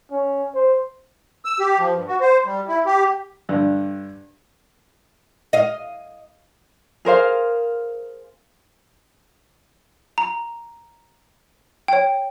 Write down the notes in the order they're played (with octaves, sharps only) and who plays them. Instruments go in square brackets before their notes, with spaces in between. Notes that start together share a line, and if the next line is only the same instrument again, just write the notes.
[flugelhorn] C#4
C5
[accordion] E6
G4
F3
G2
F#4
C5
G3
E4
G4
[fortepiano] G2 D3
[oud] D#5 F5
[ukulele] G#4 A#4 C5 F5
[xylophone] A#5
C#5 G5